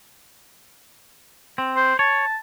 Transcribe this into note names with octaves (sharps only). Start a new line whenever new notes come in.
C4
C5
C#5 A5